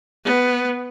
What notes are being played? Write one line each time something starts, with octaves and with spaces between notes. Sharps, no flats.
B3